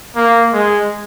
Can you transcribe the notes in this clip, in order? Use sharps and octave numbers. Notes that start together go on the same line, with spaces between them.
A#3
G#3